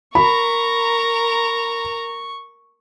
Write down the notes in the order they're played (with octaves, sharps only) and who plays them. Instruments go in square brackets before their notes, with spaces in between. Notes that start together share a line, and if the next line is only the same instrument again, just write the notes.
[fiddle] A#4 A#5 [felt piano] B5 [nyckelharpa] C#6